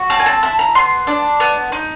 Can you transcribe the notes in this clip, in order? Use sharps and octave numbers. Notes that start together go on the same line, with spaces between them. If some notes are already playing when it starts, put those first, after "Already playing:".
Already playing: F#4
C4 A5
G#5
A5
E4 A5
A#5
B3 C6
D4
B3
D#4